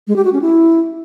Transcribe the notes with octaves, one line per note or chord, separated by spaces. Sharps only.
G#3
G4
F#4
C#4
E4